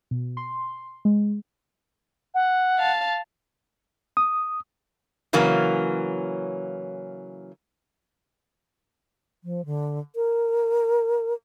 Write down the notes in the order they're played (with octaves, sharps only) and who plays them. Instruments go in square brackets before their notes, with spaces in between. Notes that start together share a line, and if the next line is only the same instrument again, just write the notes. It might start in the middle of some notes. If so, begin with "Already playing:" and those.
[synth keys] B2
C6
G#3
[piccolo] F#5
[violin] F5 A5
[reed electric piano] D#6
[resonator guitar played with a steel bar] C#3 E3 F#3 A#3 C#4
[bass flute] F3
D3
A#4